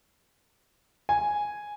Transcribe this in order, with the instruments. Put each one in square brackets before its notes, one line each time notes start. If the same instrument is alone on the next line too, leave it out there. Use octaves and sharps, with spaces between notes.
[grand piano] G#5